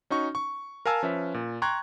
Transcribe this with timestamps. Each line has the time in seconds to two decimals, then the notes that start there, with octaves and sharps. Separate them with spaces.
0.10 C#4 D#4 F#4 C#6
0.35 C#6
0.86 A#4 F5 G#5 A5 E6
1.03 F3 C#4 B4 E5
1.34 A#2
1.62 G5 A#5 C6 C#6 F#6 G#6